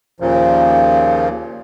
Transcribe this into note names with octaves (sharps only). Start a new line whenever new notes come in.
D#2 A#2 C#3 F3